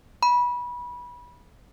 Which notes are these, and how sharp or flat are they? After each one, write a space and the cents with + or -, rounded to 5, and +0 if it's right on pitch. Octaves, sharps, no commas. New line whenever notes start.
B5 -20